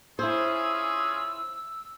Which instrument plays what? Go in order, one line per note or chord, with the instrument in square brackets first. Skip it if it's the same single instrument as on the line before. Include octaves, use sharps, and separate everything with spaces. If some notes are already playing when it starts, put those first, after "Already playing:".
[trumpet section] C#4 F4 G#4 [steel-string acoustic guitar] E4 C5 [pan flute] E6